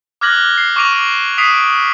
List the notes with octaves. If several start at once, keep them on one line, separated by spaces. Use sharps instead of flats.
D6 F6 F#6 G#6 A#6 F#7
C7
C#6 D6 A#6 D7 D#7 F7
D#6 B6 C7 D7 D#7 F7